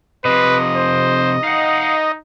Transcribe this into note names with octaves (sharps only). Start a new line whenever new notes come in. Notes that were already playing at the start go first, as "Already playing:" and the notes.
C3 F3 B4 D#5
C5
D#4 F5 F#5